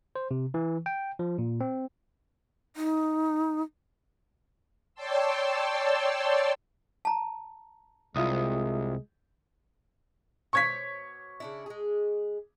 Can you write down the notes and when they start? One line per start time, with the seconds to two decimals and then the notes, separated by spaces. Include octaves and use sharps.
0.16 C5
0.31 C3
0.54 E3
0.86 G5
1.19 F3
1.38 A#2
1.61 C4
2.76 D#4
4.94 C#5 D5 G5 A5 C6 E6
7.05 A5 A#5
8.16 C2 G#3 F4 E5 D#6
10.53 B2 C5 C#5 C#6 G#6 B6
11.40 C#3 D4 E4
11.66 G#3 G#4